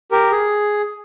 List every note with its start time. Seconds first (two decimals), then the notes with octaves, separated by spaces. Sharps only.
0.11 G4 A#4
0.32 G#4